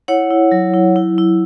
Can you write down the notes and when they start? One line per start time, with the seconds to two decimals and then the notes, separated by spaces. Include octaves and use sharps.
0.08 E4 C#5 F#5
0.31 E4
0.52 F#3
0.74 E4
0.96 E4
1.18 E4